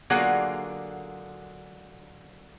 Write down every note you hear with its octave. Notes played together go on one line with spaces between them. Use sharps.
D3 F#3 A#3 F4 G#4 F#5